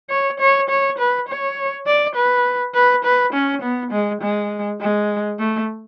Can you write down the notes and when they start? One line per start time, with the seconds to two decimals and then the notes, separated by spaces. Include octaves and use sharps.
0.10 C#5
0.40 C#5
0.70 C#5
0.99 B4
1.28 C#5
1.86 D5
2.16 B4
2.74 B4
3.05 B4
3.34 C#4
3.62 B3
3.91 G#3
4.21 G#3
4.80 G#3
5.39 A3